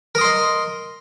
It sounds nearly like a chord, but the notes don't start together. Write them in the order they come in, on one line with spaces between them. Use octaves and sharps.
A#4 D#6 C6 D#5